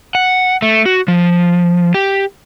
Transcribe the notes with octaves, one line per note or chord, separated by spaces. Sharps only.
F#5
A3
F#4
F3
G4